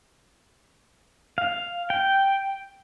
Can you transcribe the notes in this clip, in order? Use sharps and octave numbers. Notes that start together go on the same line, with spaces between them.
F5
G5